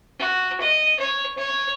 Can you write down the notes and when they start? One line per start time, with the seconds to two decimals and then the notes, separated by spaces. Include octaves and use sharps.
0.19 F#4
0.61 D#5
0.99 C#5
1.37 C#5